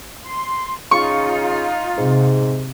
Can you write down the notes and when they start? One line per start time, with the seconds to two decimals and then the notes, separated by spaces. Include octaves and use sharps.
0.25 C6
0.91 C#3 D#4 F4 C#6
1.97 G#2 C3